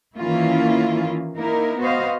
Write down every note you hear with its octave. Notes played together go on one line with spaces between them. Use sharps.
D#3 E3 A#3 C#4 E4 F4
A#3 D#4 E4 A#4
B3 F#4 C5 D#5 F5